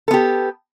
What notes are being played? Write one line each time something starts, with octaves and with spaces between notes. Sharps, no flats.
B3 G4 A4